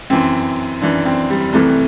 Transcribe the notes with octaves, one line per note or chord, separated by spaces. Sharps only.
F#2 E3 C4
F#2 E3 D4
C4
G3
C2 C3 E3 A3